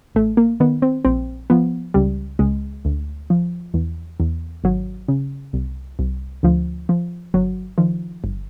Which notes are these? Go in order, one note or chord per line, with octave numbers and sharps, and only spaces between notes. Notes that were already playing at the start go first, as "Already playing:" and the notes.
A1 A3
A#3
D#3 B3
C4
A#1 C4
F3 B3
C#2 G3
C#2 G#3
D2
F3
E2
E2
G#1 F#3
C#3
C2
C2
D2 F3
F3
G1 F#3
D#3 F3
G1